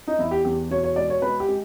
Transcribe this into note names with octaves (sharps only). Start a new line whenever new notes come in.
D#4
E2 E4
G4
E2 G4
B2 C#5
C#5
G#3 D5
C#5
G#3 B4
G4
G#3